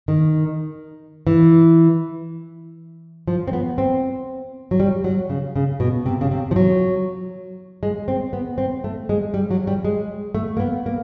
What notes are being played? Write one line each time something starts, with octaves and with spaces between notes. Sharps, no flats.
D#3
E3
F3
C4
B3
C4
F#3
G3
F#3
C#3
C#3
B2
C3
C#3
C3
F3
F#3
G#3
C4
B3
C4
A3
G#3
G3
F#3
G3
G#3
A3
A#3
B3
A#3